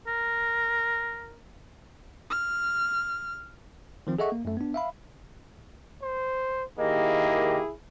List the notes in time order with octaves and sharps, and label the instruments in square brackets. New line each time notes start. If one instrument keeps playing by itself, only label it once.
[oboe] A#4
[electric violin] F6
[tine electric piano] D#3 F3 C4
G#4 A4 D#5 E5 F#5 C#6
A#3
F#2 A3
B3 D4
E5 F5 B5
[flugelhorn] C5
[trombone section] D#3 G4 [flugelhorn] A#3 [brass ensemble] E4 G#4 [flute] D#5